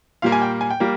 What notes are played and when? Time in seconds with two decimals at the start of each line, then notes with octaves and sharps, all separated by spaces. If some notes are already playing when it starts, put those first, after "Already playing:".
0.22 A#2 G3 A#3 F5
0.32 G#5
0.42 G5
0.61 G#5
0.70 G5
0.80 G3 A#3